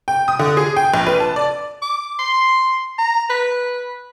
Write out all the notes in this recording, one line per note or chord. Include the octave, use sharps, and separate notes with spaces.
G5
D#6
D3
G#4
G5
A#1
B4
A5
D5
D6
C6
A#5
B4